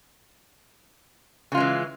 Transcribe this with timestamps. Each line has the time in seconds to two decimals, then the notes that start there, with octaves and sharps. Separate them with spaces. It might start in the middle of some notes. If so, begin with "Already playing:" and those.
1.52 C#3
1.55 F4
1.57 G#3
1.60 E3